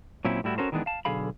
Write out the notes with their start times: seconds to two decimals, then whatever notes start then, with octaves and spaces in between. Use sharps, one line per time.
0.25 A#2 F#3 C4 C#4 E4
0.44 A2 G3 E4 F#4
0.58 C#4 F#4 A4 A#4 C5
0.72 D#3 E3 G#3 B3 D4
0.86 F5 A5
1.05 B1 D3 G#4 F5 B5